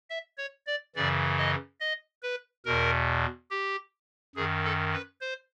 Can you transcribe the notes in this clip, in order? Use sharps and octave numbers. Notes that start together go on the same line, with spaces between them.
E5
C#5
D5
F#2 C#3 E3 D5
D#5
D#5
B4
E2 B2 A#4
G4
F#2 D#3 G#4
A4
B4
C5